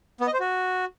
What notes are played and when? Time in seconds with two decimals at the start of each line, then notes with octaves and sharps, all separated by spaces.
0.21 B3
0.27 D#5
0.33 C5
0.40 F#4